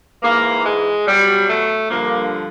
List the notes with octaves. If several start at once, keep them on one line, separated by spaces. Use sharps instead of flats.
G#2 E3 A#3
G#3
B2 F#3 G3
A3
G2 D3 F3 A#3